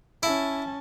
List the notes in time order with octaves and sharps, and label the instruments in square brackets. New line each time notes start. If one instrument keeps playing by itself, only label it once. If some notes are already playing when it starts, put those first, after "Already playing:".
[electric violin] C#4 A5 [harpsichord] E4